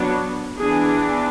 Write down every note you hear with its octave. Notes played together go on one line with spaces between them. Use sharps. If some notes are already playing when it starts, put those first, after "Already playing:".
Already playing: F#3 B3 D4
E3 B3 D4 G#4